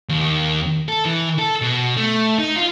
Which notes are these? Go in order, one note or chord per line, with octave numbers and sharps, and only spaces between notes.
D#2
A4
E3
A4
B2
A3
D#4
F4